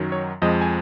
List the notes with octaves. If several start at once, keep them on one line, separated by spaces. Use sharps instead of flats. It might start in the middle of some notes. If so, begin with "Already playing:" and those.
Already playing: F#2 D#3 F#3
C#5
F2 F3 G#3 D#5
G#5